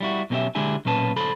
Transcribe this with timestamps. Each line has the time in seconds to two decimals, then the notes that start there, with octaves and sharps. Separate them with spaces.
0.01 G3 E4 F#4
0.30 B1 B2 C4 C#4 G4 E5
0.55 D3 G#3 D4 E4 G4 G#5
0.85 B1 A#2 C#4 B4 A5
1.16 B1 D3 A4 C5 B5